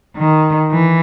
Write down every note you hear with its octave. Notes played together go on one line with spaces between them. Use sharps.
D#3
E3